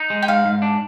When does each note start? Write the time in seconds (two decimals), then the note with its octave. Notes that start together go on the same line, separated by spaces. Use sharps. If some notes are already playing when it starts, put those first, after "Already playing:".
Already playing: D#4
0.10 G#3
0.22 G5
0.28 G#2 F5
0.45 G#2
0.62 D4